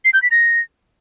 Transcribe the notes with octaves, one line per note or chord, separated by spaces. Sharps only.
C7
G6
B6
A#6